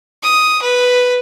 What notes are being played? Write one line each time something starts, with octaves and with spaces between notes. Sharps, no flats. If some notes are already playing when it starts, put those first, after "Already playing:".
D#6
B4